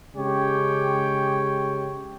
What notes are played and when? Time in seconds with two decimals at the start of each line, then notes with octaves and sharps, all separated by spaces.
0.15 C#3 G#3 G4 C#5 G5